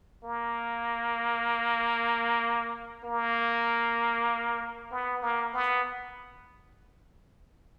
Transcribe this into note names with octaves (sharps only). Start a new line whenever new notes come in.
A#3
A#3
B3
A#3
B3